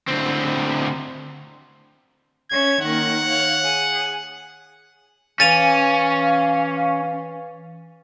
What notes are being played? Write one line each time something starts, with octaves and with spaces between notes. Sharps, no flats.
D2 C4
C#4 C#5 E5 G#6
D#3 A#3 F#5
C#5 F5
G#4
E3 C#4 F5 A6 D#7 F7